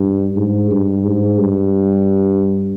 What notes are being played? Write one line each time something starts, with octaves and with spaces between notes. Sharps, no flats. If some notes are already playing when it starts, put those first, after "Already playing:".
Already playing: G2
G#2
G2
G#2
G2